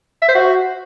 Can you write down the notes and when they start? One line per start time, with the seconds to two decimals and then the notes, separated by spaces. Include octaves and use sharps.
0.22 E5
0.29 C5
0.35 F#4